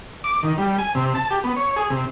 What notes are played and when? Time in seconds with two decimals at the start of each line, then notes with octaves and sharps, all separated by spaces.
0.24 D6
0.43 D#3
0.58 G3
0.79 G#5
0.95 C3
1.15 A5
1.30 G4
1.44 B3
1.56 C#5
1.76 G#4
1.90 C3